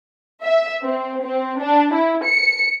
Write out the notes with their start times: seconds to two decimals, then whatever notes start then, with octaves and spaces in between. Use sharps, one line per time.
0.42 E5
0.83 C4
1.23 C4
1.60 D4
1.94 E4
2.25 C#7